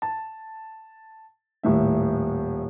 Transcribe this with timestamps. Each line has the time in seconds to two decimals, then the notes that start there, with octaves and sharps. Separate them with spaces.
0.02 A5
1.63 D#1 A2 E5